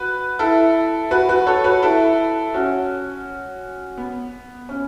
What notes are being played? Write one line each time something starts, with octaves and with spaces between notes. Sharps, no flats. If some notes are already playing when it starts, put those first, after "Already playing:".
Already playing: F#4 B4
E4 A4
F#4 B4
F#4 B4
A4 C#5
F#4 B4
E4 A4
C#4 F#4
B3
C#4